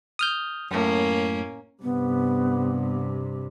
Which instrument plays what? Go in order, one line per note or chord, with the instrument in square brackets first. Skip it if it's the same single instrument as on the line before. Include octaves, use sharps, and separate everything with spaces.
[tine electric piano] D#6 F6 G6
[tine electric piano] F#2 A2 [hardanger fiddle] A#3 C#4
[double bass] G2 C3 [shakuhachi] B3